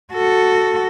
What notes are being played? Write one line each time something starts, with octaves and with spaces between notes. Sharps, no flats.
F#4 A4